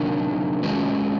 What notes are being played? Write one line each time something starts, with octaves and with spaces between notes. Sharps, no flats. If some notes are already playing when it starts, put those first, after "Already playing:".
Already playing: C3 D#3 F#3 A#3 D4
D#3 G#3 C#4 F#4 B4